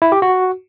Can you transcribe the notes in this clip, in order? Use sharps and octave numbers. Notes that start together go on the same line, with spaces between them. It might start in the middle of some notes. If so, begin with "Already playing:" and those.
E4
G4
F#4